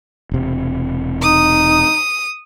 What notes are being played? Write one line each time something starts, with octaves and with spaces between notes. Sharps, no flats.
E1 C3
D#4 D#6